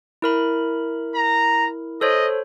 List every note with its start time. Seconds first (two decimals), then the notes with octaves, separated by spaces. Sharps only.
0.22 E4 A#4 B5
1.15 A#5
2.01 A4 C5 C#5 D#5